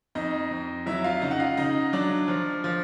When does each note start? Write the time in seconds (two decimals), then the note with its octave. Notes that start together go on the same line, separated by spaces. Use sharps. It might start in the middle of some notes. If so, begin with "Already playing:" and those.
0.15 F2 D#4 D#5
0.51 F2
0.86 F#3 E4 E5
1.04 F4 F5
1.21 C#3 D#4 D#5
1.31 F#5
1.40 F4 F5
1.57 C#3 D#4 D#5
1.93 F#3 D4 D5
2.28 F3
2.64 F3